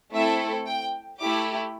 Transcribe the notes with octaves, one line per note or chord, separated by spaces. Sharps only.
A3 C4 E4 A4 E5
G5
A3 E4 G4 D6